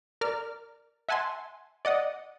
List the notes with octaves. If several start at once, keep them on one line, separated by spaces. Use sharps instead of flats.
A#4 D5 F6
E5 F#5 G#5 A5 C6
D5 D#5 F#5 D#6